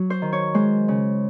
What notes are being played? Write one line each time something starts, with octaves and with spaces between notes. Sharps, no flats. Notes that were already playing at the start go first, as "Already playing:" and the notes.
Already playing: F#3
C5
D#3
C#5
G#3 C5
C#3